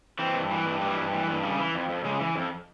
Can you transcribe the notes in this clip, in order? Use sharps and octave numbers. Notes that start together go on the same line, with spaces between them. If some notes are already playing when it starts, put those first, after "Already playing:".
E3 C4
G2
E3
G2
E3 G3
G2
E3
G2
C#3 G3
E3
F2
F2
C#3 G#3
E3
F2